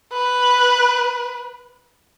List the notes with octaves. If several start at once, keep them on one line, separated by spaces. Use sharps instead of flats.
B4